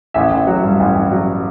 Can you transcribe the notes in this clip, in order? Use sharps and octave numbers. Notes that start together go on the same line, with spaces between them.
A1 E5
A1
F#3
G2
A1
A1
F#3